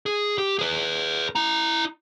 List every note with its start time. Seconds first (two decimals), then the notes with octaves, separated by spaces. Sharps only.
0.06 G#4
0.38 G4
0.59 G#4 B4
1.35 E4 A#5